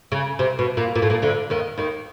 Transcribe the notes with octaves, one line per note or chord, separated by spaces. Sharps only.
C#3
C3
B2
A#2
A#2
A2
A#2
D2 D3
D#2 D#3
D#2 D#3